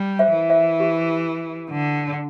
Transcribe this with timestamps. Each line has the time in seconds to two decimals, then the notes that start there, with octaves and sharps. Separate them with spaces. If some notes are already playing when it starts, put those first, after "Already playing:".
Already playing: G3
0.19 C5 E5
0.35 E3
0.50 C5 E5
0.80 G4
1.70 D3